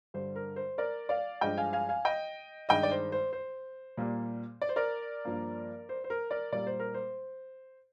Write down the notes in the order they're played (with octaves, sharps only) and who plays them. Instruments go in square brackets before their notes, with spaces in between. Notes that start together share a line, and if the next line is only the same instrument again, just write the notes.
[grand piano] G2 D3 G3 C5
A#4
C5
A#4 D5
D5 F5
G2 F3 G#3 D#5 G5
F5 G#5
F5 G#5
F5 G#5
D#5 G5
G2 D#3 G#3 D#5 G5
D5
C5
C5
C5
A#2 G3 A#3
D5
C5
A#4 D5
G2 F3 A#3
C5
C5
A#4
A#4 D5
A#2 G3 A#3 D5
C5
A#4
C5